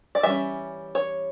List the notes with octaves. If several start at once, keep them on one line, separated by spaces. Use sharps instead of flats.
D5
E3 G3 C#4 E5
C#5